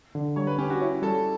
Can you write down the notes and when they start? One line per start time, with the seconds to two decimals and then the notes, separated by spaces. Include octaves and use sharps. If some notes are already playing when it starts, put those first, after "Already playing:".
0.15 D3
0.36 G3 C#5
0.47 B4
0.58 C#4 G4
0.70 F#4
0.81 E4 C#5
1.02 G3 A4